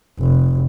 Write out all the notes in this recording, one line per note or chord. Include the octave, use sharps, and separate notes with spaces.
F1